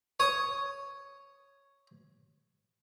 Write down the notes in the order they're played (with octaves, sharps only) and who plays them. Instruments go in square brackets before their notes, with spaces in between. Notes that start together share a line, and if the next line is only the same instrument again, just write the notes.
[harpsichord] C#5 D#6